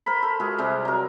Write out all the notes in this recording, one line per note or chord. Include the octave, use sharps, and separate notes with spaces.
A#4 C5 B5
A4
G#3 F4 F#4 G#4
C3 G3 G#3 C4
F#3 A#4